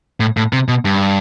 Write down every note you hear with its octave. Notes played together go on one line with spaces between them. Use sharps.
A2
A2
C3
B2
G2